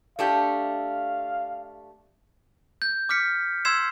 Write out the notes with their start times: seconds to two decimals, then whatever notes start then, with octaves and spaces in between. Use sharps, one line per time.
0.19 A3 D4 G4 F5
2.82 G6
3.09 D6 F6 B6 C#7
3.65 C6 E6 G#6 C7 E7